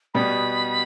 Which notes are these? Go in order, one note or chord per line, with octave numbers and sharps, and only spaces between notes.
B2 G3 B3 B5